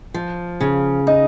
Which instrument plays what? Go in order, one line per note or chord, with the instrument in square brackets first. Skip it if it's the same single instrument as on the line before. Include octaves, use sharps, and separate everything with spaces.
[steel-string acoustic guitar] F3
C#3
[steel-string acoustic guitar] D#4 [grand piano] D#5